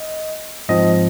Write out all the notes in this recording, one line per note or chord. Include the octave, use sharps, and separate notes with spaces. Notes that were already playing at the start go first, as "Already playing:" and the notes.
Already playing: D#5
G#2 F3 C4 D#5